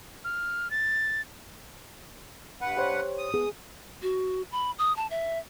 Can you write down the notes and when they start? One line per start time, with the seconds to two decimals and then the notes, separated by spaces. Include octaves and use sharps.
0.24 F6
0.70 A6
2.61 G2 B4 F#5
2.77 G4 C5 C#5
3.18 D#6
3.34 B3 G#4
4.03 F#4
4.52 B5
4.78 D#6
4.96 A5
5.10 E5